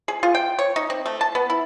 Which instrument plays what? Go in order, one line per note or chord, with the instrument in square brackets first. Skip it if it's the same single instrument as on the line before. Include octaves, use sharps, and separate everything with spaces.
[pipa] G#4
F4
G5
C#5
D#4
C4
A3
A5
B3
E4